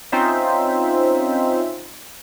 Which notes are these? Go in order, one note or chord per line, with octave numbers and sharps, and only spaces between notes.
C4 C#4 D#4 F4 C5 E5